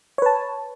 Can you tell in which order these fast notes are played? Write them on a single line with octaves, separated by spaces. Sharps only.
C#5 B4 A5